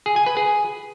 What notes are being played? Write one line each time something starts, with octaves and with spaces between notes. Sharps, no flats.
G#4
G#5
B4
G#4